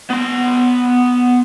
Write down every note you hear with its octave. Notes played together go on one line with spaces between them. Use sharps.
B3 C6